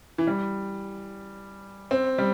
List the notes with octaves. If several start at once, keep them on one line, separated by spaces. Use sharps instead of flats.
E3
G3
C4
G3